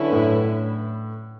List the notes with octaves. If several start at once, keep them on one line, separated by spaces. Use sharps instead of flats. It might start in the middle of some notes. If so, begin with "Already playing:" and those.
Already playing: D3 F#3 C#4 E4 B4
A2